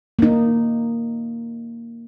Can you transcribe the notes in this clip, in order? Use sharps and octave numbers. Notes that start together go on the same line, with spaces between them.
A#3 D#4